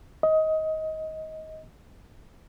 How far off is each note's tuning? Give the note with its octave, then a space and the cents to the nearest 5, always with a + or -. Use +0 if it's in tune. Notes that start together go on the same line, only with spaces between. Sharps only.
D#5 +20